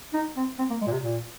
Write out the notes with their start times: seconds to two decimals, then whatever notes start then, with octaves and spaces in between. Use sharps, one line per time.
0.14 D#4
0.36 C4
0.58 C4
0.70 A#3
0.81 G#3
0.87 A#2
0.92 C3
1.03 A#2